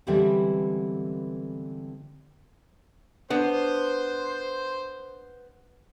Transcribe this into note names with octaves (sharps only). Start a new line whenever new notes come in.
D3 E3 G3 G#3 B3 C4
B3 D4 C5